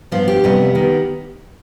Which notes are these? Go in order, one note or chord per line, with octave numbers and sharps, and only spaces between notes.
G2 F3 B3 F4
G4
F2 C3 G3 B3
D#3 B3